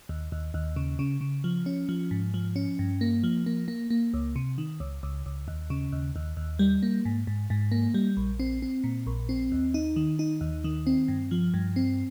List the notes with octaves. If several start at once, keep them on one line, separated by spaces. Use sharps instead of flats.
D#2
D#2
D#2
C#3
C#3
C#3
F3
C#4
F3
G#2
F3
C#4
G2
A#3
F3
A#3
A#3
A#3
C#2
C3
D#3
C#2
C#2
C#2
D#2
C#3
D#2
D#2
D#2
G3
A#3
G#2
G#2
G#2
A#3
G3
A#1
C4
C4
A#2
A#1
C4
D#2
D#4
D#3
D#4
D#2
D#3
C4
G2
F3
G2
C4